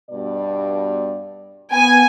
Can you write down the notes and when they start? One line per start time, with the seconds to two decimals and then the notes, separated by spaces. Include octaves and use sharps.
0.10 G2 B2 D5
1.72 B3 G#5